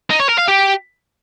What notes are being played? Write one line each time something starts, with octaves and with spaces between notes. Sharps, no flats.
D#4
C#5
A#4
F5
G4